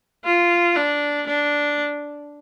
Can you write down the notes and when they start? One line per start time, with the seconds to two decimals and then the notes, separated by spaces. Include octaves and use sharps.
0.25 F4
0.76 D4
1.27 D4